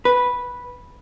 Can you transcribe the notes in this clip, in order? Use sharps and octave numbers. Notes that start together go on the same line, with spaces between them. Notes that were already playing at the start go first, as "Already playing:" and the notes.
B4